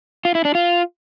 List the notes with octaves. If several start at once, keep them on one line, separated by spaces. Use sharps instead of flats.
F4
E4
D4
F4